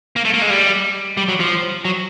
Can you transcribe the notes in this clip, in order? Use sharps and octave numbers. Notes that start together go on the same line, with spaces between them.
A#3
A3
A#3
G#3
G3
G3
F#3
F3
F#3